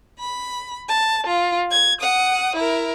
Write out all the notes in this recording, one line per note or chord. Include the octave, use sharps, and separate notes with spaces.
B5
A5
F4
G#6
F#5 D#6
E4 A#4